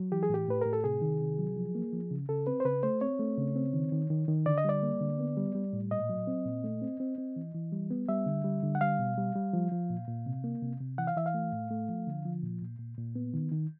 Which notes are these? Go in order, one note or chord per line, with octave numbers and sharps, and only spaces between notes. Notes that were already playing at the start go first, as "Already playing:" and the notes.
Already playing: F#3
E3 G4
G#4
A2 G4
A2 B4
A2 A#4
A4
C3 G#4
D#3
C3
F#3
F3
A#3
F3
C#3
C#3 A4
C4 B4
C5
C#3 B4
A3 C5
C4 C#5
A3
C#3
C4
D#3
D#3
D#3
D#3
D3 D5
D#5
G3 D5
A#3
D3
B3
G3
G3
A2
A#2 D#5
F#3
C4
A#2
A3
C4
C4
C4
E3
E3
G3
B3
G3 E5
D3
G3
D3
F#5
G3 F5
B2
G3
G3
F3
F3
A#2
A#2
C3
A#3
C3
C3
E3 F#5
F5
E3 E5
F5
A3
A2
A3
F3
D3
F3
A#2
A#2
A#2
A#2
B3
D#3
D#3